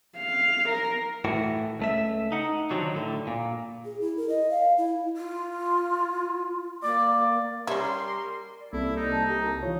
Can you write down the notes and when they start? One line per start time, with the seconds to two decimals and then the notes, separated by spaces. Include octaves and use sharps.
0.18 F5
0.69 A#4
1.25 A2 E3 F#4
1.79 C#2 A3 E5
2.32 D#4 F#5
2.70 D#3 F3 F#3 D4
2.95 A2 D3
3.27 A#2
3.85 G#4
4.01 E4
4.17 A#4
4.29 D#5
4.50 F5
4.78 E4
5.17 F4
6.83 A#3 D5
7.67 G3 C#4 E4 A#4 C6
8.60 D5
8.73 C2 A#3 C4 E4 A4
8.97 D#4
9.12 A5
9.30 G4 A#5
9.63 E3 F4 C#5